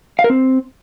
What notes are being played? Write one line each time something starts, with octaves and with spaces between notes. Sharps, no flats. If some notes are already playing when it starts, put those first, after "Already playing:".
F5
A#4
C4